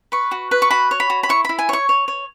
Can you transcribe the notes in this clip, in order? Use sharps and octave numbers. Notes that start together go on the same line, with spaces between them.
B4 C#6
F#4
B4
C#6
F#4 B5
C#5
B5
F#4
B5
E4 C#6
E4 B5
G#5
C#5 C#6
C#5
C#5